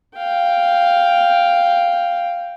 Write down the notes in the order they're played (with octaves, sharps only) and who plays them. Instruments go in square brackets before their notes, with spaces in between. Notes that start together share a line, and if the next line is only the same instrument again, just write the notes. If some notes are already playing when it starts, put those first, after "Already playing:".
[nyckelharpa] F5 G5